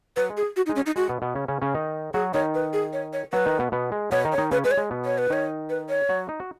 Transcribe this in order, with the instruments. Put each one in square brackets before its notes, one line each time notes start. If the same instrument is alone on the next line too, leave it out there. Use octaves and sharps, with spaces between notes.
[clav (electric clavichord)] F#3 [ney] B4
[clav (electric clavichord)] G#3
[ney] G#4
F#4
D#4
[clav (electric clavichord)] G#3
[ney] C#4
D#4
[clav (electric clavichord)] G#3 [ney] F#4
[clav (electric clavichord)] B2 B3
B2 B3
C#3 C#4
C#3 C#4
C#3 C#4
D#3 D#4
[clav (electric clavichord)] F#3 F#4 [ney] G#4
[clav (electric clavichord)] D#3 D#4 [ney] C#5
[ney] B4
G#4
C#5
C#5
[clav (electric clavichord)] F#3 F#4 [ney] B4
[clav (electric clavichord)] D#3 D#4
B2 B3
B2 B3
G#3
[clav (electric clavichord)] B2 B3 [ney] C#5
[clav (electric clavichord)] D#3 D#4
[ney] C#5
[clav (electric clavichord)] D#3 D#4
[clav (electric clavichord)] C#3 C#4 [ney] B4
[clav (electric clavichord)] G#3 [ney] B4
[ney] C#5
[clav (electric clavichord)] G#3
B2 B3
[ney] C#5
B4
[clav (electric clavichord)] D#3 D#4 [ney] C#5
[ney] B4
C#5
[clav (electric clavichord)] F#3 F#4
D#4
F#4